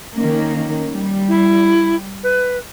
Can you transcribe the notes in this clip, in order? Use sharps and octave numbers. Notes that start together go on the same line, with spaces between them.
D#3 A#3 C#4
G3
E4
B4